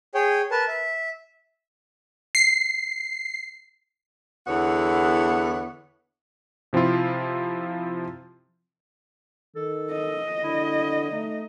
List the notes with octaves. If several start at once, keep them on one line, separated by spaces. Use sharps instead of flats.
G#4 C#5 G5
A#4 B4 A5
E5
C7
E2 D3 B3 E4 C#5 F#5
C3 F3 C4 E4 F4
D#3 A4
D#5
D3 E4
A3 D#4